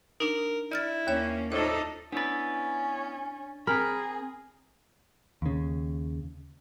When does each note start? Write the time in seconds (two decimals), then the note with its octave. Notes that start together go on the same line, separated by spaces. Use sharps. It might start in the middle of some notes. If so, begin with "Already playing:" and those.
0.20 D4 D#4 A#4
0.72 E4 D5 F6 A6
1.07 D#2 A#3 C#4 C#5 E5
1.52 A2 D4 D#4 F4 A4 C5
2.12 B3 C#4 D4 E4 B4 A6
3.67 C4 G#4 A#4 B5
5.42 D#2 C#3